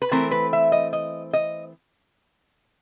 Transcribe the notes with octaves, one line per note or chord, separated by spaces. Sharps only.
B4
E3 A3 C4 A#4
B4
E5
D#5
D#5
D#5